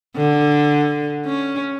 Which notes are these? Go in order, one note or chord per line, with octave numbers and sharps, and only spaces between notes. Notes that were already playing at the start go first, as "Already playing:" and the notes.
D3
C#4